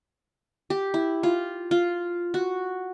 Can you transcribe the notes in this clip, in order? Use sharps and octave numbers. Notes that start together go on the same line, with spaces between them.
G4
E4
F4
F4
F#4